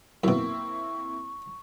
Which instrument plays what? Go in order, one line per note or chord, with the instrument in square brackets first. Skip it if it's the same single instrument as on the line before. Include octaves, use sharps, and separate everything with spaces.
[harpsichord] F#2 B2 [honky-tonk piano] A#3 C4 E4 [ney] C#6